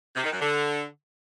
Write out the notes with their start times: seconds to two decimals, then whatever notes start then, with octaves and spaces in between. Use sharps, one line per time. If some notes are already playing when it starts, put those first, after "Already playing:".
0.15 C3
0.23 D#3
0.32 F#2
0.40 D3